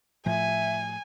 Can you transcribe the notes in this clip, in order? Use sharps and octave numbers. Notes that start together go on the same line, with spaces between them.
A2 F3 E5 G#5